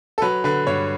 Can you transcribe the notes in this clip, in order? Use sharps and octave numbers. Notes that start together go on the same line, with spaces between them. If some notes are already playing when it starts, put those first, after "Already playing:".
A4
F#3 B4
D3 B4
G2 C#5